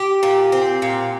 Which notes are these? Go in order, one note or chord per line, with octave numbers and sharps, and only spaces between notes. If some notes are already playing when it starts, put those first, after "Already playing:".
Already playing: G4
A#2
C4
A#2